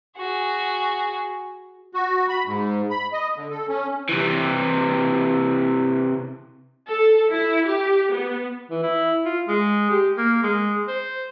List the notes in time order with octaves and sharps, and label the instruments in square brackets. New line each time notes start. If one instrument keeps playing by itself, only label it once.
[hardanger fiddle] F#4 G#4
[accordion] F#4
B5
G#2
B5
D#5
D3
A4
C#4
[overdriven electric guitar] C3 E3
[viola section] A4
E4
G4
B3
[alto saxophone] E3
E4
F4
G#3
G4
A#3
G#3
C5